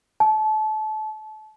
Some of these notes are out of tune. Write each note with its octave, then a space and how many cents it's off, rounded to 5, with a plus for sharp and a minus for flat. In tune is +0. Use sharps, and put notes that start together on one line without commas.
A5 -30